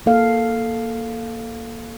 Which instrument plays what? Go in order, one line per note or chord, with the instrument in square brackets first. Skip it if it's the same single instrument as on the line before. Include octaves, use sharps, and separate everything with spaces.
[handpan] A#3 A4 F5